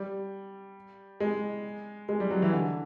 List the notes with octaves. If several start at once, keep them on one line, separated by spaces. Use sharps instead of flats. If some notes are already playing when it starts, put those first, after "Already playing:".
Already playing: G3
G#3
G#3
G3
F#3
E3
D3